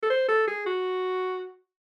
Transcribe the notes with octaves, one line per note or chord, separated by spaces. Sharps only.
A4
C5
A4
G#4
F#4